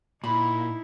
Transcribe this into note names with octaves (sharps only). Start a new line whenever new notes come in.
A#2 D#4 E4 B5